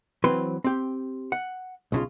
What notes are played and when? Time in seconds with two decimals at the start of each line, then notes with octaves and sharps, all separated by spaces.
0.24 E3 F#3 C4 B4 C6
0.64 C4 G4
1.32 F#5
1.92 B1 C#3 F4